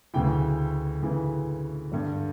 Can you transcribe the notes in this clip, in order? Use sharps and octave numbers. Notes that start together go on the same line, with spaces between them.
D2 C#3 E3 G5
D2 C#3 E3
G2 D3 G3